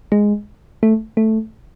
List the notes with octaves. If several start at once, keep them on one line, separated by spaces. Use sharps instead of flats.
G#3
A3
A3